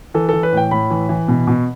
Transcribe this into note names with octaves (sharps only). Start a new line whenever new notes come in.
E3 A4
E3 A4
B4
A2 G5
A2 B5
E3
E3
B2
B2